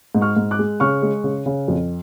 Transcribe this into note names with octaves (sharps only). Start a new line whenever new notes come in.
G#2
C#6 F6
G#2
D6 F#6
G#3
C#3 C#6 F6
G#3
C#3
C#3
F2